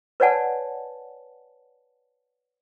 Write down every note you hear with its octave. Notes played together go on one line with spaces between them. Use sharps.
B4 C#5 D5 F#5 G#5 A5